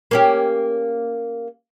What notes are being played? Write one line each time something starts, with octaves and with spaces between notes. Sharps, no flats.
A#3 C#4 G4